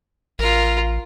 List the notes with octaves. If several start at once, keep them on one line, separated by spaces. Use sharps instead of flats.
A1 F4 A#4